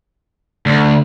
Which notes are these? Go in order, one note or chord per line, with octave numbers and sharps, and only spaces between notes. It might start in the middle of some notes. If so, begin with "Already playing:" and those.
D2